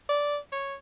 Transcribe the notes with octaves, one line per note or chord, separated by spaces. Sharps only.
D5
C#5